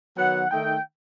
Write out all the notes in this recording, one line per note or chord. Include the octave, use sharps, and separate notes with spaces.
D#3 F#3 B3 F#5
D#3 A3 D#4 G5